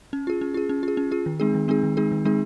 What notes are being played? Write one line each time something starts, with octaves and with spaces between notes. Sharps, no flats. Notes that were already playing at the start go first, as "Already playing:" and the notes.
C#4
F4 G#4
C#4
F4 G#4
C#4
F4 G#4
C#4
F4 G#4
D#3
G#3 C4 D#4 G#4
D#3
G#3 C4 D#4 G#4
D#3
G#3 C4 D#4 G#4
D#3
G#3 C4 D#4 G#4